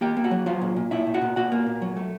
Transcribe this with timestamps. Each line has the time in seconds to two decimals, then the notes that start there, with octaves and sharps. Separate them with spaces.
0.01 A#3 G4 G5
0.17 A#3
0.24 F#4 F#5
0.31 F#3
0.46 F#3 F4 F5
0.61 A#2
0.76 A#2
0.91 A#2 E4 E5
1.07 A#2
1.14 F#4 F#5
1.22 A#2
1.36 A#2 F#4 F#5
1.52 A#3
1.67 A#2
1.82 F#3
1.97 A3